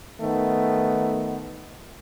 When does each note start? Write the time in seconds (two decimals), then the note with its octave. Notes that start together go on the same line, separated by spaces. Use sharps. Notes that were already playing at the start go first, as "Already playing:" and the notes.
0.21 D#3 A3 B3